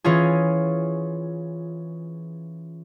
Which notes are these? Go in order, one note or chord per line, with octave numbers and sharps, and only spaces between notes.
E3 C#4 F4 G#4